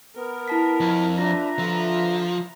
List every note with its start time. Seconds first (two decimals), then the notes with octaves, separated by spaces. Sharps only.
0.18 B3 A#4
0.48 E4 A5 B6
0.80 F2
1.18 D4 F4 B4 E5 A#5 A#6
1.59 D3 F3